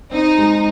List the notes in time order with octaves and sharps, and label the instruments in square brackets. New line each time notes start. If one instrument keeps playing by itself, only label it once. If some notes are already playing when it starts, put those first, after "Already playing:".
[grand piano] C4 [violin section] D#4
[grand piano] G#3